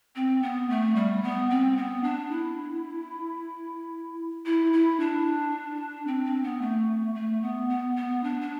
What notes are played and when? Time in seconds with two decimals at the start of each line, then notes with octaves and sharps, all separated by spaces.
0.16 C4
0.43 B3
0.70 A3
0.96 G3
1.23 B3
1.50 C4
1.77 B3
2.03 D4
2.31 E4
4.46 E4
4.73 E4
5.00 D4
6.07 C4
6.25 C4
6.44 B3
6.61 A3
7.15 A3
7.42 B3
7.70 B3
7.96 B3
8.23 D4
8.41 D4